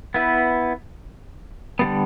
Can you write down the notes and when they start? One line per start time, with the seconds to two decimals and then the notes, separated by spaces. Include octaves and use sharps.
0.14 B3 E4 B4
1.79 D3 G3 B3